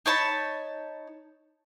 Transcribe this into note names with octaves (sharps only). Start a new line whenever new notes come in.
D#4 C#5 A5 B5